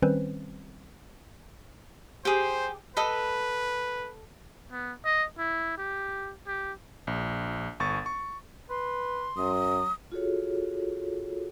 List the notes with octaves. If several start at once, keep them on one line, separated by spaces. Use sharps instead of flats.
D#3 G3 C4 C#4 B4 C5
G4 G#4 C5
A4 B4 D#5 B5
B3
D#5
E4
G4
G4
A#1
G1 C#6 A6
C#6
B4 C6
F#2 F#3 D#6
F4 F#4 G#4 A4 C#5